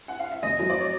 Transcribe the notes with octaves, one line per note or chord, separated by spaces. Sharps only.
F#5
F5
E5
F1 D#5
F#3 D#5
D5
C#5